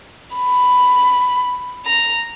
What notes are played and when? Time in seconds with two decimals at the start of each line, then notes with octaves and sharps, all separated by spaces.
0.35 B5
1.86 A#5